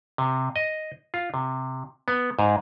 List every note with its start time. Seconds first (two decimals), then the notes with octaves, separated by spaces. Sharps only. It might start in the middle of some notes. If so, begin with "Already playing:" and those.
0.18 C3
0.56 D#5
1.14 F4
1.34 C3
2.08 B3
2.39 G#2